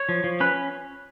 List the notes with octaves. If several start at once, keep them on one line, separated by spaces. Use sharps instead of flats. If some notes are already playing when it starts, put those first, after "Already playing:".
Already playing: C#5
F3
F3
C#4 B4